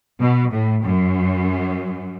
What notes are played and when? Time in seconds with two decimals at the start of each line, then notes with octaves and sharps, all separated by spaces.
0.21 B2
0.52 A2
0.83 F#2